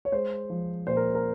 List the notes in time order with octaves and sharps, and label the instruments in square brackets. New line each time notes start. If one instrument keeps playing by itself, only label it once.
[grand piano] C#5
G#3 C5
F3
A#2 C5
A#4
A#4